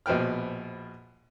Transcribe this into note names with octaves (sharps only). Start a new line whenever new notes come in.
A#1 B2 F3 B4 G5 F6